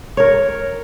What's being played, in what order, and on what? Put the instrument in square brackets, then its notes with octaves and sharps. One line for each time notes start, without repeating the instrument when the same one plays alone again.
[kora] A#4 C#5